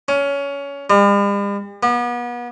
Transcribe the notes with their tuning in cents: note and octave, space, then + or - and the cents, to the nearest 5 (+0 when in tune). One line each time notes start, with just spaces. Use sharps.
C#4 +20
G3 +45
B3 -35